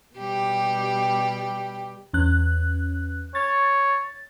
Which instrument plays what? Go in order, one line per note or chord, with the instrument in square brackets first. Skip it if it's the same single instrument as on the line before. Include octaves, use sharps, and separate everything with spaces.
[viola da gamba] B2 G3 G4
[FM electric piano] E2 C#4 F#6
[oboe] C#5 [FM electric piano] A6